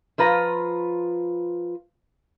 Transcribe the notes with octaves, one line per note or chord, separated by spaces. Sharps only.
F3 F4 B4 A#5